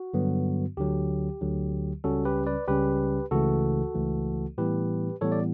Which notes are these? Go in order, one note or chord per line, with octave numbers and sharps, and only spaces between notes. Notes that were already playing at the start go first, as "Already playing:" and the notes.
Already playing: F#4
G2 D3 F#3 B3
D2 D3 F#3 G4
D2 D3 F#3
C#2 C#3 G3 C#4 F#4 A4
G4 B4
B4 D5
C#2 C#3 G3 C#4 G4 B4
C#2 C#3 E3 A3 F#4 A4
C#2 C#3 E3 A3
A2 E3 G3 B3 G4 B4
A2 E3 G3 B3 A4 C#5
D5